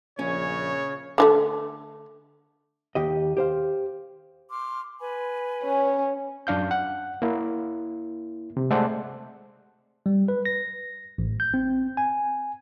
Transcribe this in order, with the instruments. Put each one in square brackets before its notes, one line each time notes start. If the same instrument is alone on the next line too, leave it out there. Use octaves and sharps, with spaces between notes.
[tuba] A#1 [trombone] C#3 [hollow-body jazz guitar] C#4 [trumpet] C#5
[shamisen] D3 F3 A3
[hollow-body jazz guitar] D#2 G4 D#5
G4 C5 F5
[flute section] C6 D6 F6
B4 G#5 B5
[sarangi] C#4
[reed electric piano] F#2 D4 F5 G6
F#5
A#3 E4
C3
G#3 A3 A4 C5 D5 F#5
[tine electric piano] G3
B4
A#6
A1
G6
C4
G#5